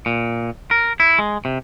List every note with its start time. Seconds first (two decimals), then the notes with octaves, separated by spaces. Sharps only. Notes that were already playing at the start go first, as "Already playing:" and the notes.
0.06 A#2
0.71 A#4
1.00 E4
1.19 G#3
1.45 C3